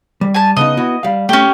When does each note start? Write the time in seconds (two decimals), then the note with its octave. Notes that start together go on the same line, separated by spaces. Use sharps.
0.21 G3
0.34 G#5 A5
0.56 C#3 B3 D#4 D#5
0.77 B3 E4 F#4
1.03 G3 F5
1.29 A3 C#4 G4